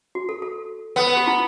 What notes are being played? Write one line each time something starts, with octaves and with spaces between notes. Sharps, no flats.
F#4
A4
A4
B3 B4
B4
G4
E4